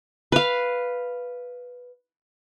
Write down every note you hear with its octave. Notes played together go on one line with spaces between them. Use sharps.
B4 F5